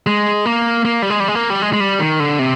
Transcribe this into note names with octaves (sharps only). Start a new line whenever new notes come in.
G#3
A#3
A#3
G3
G#3
G3
G#3
A#3
G3
G#3
G#3
G3
D#3
D3
C3